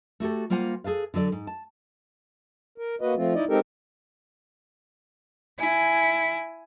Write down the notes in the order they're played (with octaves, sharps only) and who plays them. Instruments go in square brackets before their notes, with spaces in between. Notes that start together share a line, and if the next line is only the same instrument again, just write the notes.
[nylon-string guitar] A3 F#4 G4 A4
G3 A#3 F4 C5 F#5 G#5
G#4 A4 B4 F5
D3 F#3 A4 D5
G#2
A5
[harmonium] A#4
A#3 F#4 B4 D#5
F3 A3 C4 F4
D#4 E4 D5 D#5
G#3 C4 D#4 G4 A4 A#4
[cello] E4 [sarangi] G#5